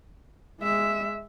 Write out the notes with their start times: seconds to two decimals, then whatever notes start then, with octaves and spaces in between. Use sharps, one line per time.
0.61 G#3 E5